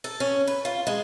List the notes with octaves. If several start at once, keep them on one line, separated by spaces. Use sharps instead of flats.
A4
C#4
B4
F4
G#3